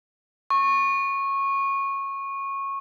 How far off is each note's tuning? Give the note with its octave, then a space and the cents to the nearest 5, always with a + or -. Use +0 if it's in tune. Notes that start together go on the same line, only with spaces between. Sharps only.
C#6 -15